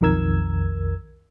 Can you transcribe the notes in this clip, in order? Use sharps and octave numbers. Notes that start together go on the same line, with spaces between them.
B1 F2 D#3 A#4 E6 G#6